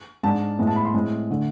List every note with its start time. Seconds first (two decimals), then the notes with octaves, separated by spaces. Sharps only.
0.23 G#2 G#3 D4 A5
0.59 A2 G#3 B3
0.67 A5
0.76 B5
0.85 C6
0.94 A2 G#3 C4
1.30 D3 A3 D4